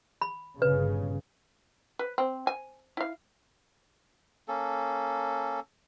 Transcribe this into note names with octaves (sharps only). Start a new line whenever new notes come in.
B5
G1 C#3 B4
B4
C4
G#5
E4 F5
A#3 C#4 A4